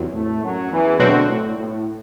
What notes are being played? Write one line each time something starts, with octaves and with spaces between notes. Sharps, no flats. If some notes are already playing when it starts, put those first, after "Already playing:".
Already playing: E2 C3 F#3
A2 A3
F#2 F#3
E2 E3
D2 B2 D3 F#3 C4 F#4
A2
A2